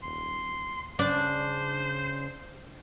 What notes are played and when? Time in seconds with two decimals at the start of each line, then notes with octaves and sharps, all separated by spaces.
0.03 D#1 C6
0.99 C#3 D4 C5